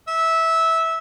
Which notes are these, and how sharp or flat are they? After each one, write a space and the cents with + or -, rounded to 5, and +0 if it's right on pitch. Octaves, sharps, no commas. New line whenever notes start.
E5 -15